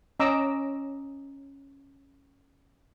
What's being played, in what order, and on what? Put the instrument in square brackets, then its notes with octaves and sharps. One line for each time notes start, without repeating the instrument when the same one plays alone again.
[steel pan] C#4 D#5 A#5 D6 E6